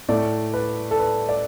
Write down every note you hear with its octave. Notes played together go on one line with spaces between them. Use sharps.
A2 A3 D5
B4
A4
B4
D5